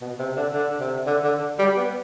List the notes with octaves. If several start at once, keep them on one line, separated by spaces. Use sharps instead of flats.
B2
C3
D3
D3
C3
D3
D3
G3
B3